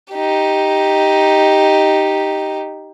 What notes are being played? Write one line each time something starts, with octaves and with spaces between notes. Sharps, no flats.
D#4 G4